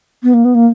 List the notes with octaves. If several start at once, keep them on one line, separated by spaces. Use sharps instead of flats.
B3
A#3
B3
A#3